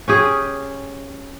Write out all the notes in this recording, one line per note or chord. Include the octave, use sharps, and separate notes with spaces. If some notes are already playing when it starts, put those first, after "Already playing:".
C#4 G4 G#4